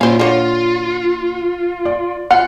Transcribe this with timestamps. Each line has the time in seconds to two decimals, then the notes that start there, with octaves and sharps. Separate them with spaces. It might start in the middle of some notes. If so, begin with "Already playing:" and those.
0.01 A#2 C#4 E4 C5 F5
0.19 D3 A#3 F4 C#5
1.85 D5
2.31 F4 F#5